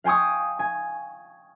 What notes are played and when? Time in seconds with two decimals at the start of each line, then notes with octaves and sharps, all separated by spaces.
0.04 F5 G5 G#5 C#6 D#6
0.59 G#5